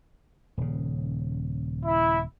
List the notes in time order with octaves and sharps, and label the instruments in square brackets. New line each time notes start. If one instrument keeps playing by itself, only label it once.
[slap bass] D#1 C#3
[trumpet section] E4